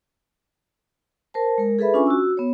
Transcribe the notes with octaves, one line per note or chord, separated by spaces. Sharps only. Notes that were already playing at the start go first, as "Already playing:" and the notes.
A#4 C5 A5
G#3 A#4
G#4 A4 B4 E5 B5
C#4 D4 F4 G#5 C#6
F#4 E6
B3 C#5